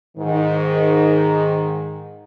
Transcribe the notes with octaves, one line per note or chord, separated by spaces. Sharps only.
G#2 D#3